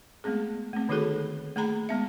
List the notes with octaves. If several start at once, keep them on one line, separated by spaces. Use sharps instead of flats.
G#3 A3 B3 C4 G#4
A3 C4
D3 D#3 D#4 F#4 G#4 A4
A3 A#3 G#4 A#5 B5
G#3 B3 E5